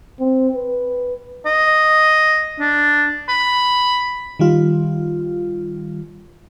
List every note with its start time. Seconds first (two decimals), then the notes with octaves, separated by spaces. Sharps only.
0.20 C4
0.55 B4
1.46 D#5
2.60 D4
3.29 B5
4.39 D#3 G3 F4